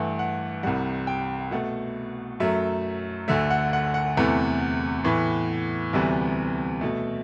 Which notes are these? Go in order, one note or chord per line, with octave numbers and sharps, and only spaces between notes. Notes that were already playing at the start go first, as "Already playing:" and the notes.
Already playing: G2 E3 A3 F#5
F#5
C2 C3 G3 F#5
G5
B2 A3 F#5
F#2 F#3 A3 E5
D2 D3 A3 E5
F#5
F#5
F#5
E2 C3 E3 A3
A2 E3 B3
D2 C3 E3 G3 B3 E5
B2 A3